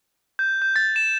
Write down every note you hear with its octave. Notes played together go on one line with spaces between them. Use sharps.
G6
G6
A6
E7